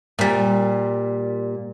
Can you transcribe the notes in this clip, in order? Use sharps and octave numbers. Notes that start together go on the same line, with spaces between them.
A#2 G3